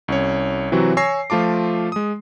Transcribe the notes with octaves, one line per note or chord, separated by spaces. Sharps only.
C2 C#4 C#5
C3 E3 F#3 C4 F#4
C#5 G#5 C#6 E6 A#6 C7
F3 A3 F4 A5 D6
G#3 D#6